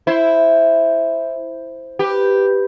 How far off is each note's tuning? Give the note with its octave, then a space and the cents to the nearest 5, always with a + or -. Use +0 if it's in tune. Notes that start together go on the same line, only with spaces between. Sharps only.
E4 +0 C5 +0
G4 +0 B4 +0